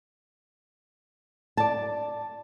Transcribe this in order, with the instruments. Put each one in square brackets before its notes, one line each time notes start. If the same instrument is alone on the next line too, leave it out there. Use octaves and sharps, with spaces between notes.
[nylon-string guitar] D5 A5